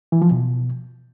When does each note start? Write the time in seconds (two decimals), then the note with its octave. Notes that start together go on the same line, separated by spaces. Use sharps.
0.12 E3
0.22 F3
0.31 B2